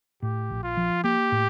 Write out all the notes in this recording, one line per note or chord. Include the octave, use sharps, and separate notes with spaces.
A2 G4
A#1
F4
F3
A#3 G4
A2